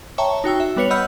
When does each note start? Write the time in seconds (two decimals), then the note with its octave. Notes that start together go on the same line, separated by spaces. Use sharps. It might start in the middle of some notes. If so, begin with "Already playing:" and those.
0.18 C#5 E5 G5 A5 A#5 C#6
0.44 D#4 F#4 G5 E6
0.60 E5
0.76 G3 B3 B4 C#5 C#7 F7
0.90 D#5 F#5 B5 E6 F6 G6